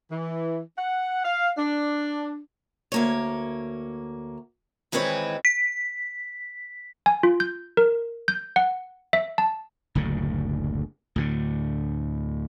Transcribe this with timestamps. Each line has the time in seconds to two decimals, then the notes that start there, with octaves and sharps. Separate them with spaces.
0.11 E3
0.78 F#5
1.24 F5
1.58 D4
2.92 D2 A#3 C#5
4.92 D#3 E3 G#3 C4 B4 C#5
5.45 B6
7.06 G#5
7.23 F4
7.40 G6
7.77 A#4
8.28 G6
8.56 F#5
9.13 E5
9.38 A5
9.95 F#1 D2 A2 D3
11.16 D2 A2 D3